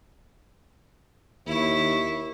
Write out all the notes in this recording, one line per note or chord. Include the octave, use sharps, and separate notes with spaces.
D#2 E4 C#6